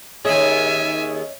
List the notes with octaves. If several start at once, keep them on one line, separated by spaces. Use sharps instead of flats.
D#2 C#4 G#4 C#5 D#5 E5 G#5